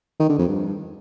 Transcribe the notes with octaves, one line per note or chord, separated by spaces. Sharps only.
D#3
D3
F2
G2